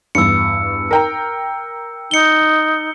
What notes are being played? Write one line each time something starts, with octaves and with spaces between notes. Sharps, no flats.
E2 G2 E6 C#7
A#4 G5 A#5
D#4 C#7 G7